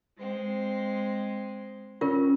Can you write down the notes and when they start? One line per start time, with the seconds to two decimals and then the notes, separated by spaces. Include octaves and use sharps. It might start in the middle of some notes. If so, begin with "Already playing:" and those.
0.17 G#3 C4
2.01 C#4 F4 A#4